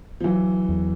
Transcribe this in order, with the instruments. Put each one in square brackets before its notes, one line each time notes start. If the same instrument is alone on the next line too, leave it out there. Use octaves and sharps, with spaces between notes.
[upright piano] F3
[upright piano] E3 [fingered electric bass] F#3
[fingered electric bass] E2